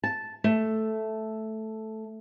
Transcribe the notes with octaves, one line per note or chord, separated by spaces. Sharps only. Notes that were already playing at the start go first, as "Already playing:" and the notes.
A5
A3